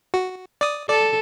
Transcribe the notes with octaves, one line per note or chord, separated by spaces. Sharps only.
F#4
D5 D#6
A4 D5